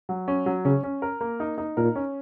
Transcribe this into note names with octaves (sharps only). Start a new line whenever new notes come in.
F#3
C#4
F#3
C#3 C#4
C#4
A#4
A#3
D#4
D#4
A#2 A#4
C#4